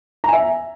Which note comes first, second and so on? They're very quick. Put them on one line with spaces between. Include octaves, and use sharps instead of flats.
A#5 G#5 E5